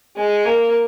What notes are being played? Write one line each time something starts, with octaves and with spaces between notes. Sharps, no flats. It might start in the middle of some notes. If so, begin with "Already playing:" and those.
G#3
A#3